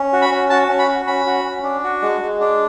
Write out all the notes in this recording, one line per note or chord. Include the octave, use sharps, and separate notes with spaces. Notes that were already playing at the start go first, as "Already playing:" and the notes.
Already playing: C#4
F#4
B5
C#4
F#4 A5
C#4
B5
F#4
C#4 B5
F#4
C#4
D4
F#4
G#3
G#3
D4